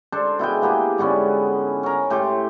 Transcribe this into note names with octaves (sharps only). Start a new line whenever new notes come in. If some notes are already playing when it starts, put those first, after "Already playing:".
D4 A4 C5
B2 E4 G#4 G5
A#3 B3 G4 G#4
G#2 D3 B3 C#4
C#4 A#4
A2 G4 C6 D6